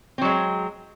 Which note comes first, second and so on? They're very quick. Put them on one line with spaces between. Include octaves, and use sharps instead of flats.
C4 F#3 G#3